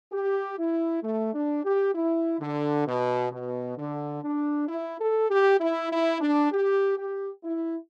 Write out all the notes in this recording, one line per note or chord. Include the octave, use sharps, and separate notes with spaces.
G4
E4
A3
D4
G4
E4
D3
B2
B2
D3
D4
E4
A4
G4
E4
E4
D4
G4
G4
E4